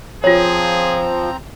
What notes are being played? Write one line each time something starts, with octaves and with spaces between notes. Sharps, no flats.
F3 C4 F4 G#4 C#5 A#5